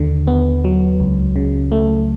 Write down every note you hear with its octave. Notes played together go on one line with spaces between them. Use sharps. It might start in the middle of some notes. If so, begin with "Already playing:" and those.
Already playing: D#2 D3
B3
F#3
C#2
C#3
A3